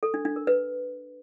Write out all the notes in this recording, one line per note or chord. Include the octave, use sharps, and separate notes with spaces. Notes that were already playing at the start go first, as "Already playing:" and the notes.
A4
D4
D4
A#4
B4